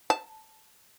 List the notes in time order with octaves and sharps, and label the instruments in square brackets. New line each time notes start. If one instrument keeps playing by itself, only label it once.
[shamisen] A5